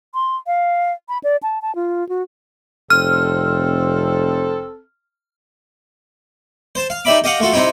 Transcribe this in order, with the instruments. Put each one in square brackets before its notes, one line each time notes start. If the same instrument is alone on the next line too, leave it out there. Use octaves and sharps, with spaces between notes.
[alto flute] C6
F5
B5
D5
A5
A5
F4
F#4
[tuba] F1 [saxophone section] C4 A4 [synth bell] F6
[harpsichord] C5 A5
F5
D#4 G4 D5 E5 B5 D6
G4 D#5 F5 F#5
A3 F4 F#4 A4
C3 C4 D#4 E4 G4